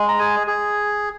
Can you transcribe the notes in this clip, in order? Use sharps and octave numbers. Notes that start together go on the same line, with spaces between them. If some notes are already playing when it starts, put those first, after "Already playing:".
Already playing: G#3
A#5
G#4 G#5
G#4